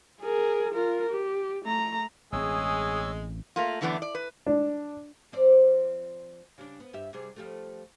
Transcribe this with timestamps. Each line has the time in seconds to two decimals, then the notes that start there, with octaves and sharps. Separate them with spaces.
0.21 G#4 A#4
0.74 F4 A#4
1.10 G4
1.65 A3 A#5
2.33 A1 G#3 C4 G#4 C#5 E6
3.56 A3 A#3 F4
3.81 F#2 D3 E3 A3 B3 D4
4.02 D5
4.15 B4
4.47 D4
5.32 F3 C4 D5
6.58 C#3 G3 D4
6.80 B3
6.93 G2 G4 E5
7.13 C3 G3 G#4
7.36 F3 G3 A3